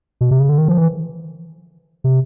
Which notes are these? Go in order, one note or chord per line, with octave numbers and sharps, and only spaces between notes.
B2
C3
C#3
D3
D#3
F3
E3
C3